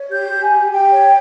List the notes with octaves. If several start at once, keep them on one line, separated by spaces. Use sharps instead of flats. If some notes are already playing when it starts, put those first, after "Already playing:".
Already playing: C#5
G4 G6
G4
G#5
G4
G4 G5
C#5